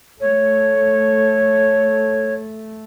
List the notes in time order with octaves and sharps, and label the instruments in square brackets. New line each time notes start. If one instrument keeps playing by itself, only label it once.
[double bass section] A3 [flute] C#5